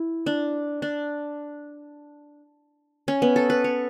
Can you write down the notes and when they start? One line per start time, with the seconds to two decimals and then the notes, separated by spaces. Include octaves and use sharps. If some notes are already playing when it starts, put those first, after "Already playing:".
Already playing: E4
0.26 D4
0.82 D4
3.08 C#4
3.22 B3
3.36 A4
3.50 B4
3.64 C#5